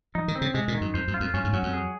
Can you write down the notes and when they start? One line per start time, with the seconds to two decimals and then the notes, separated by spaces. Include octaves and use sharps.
0.15 F3 D#4
0.28 D#3
0.35 C4
0.41 C#3
0.54 C3 G#3
0.68 A#2
0.74 D#3
0.81 F#2
0.94 F2 C5
1.08 F#2
1.14 F4
1.20 F2
1.34 F#2 C#4
1.44 G#2
1.53 F#2 F#3
1.63 F2
1.73 G#4